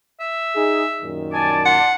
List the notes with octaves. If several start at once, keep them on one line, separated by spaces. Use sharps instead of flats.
E5
D#4 G#4
F#2 A#2 D#3
D5 G#5 A5
F#5 C6